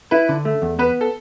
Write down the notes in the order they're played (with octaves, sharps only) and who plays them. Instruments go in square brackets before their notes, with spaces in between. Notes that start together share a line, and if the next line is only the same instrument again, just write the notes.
[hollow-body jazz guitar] E4 [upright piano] B4
[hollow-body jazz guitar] D3
A3
E2
[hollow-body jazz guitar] B3 [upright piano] B4
[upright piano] A4